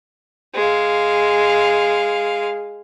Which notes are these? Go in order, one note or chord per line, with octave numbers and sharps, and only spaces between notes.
G#3 F5